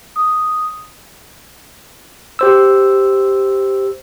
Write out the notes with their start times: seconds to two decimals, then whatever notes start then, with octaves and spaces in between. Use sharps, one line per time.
0.16 D#6
2.39 G4 C5 E6